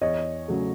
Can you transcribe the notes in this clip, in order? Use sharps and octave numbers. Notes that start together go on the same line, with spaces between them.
E2 C#5 D#5
C#3 F#3 A3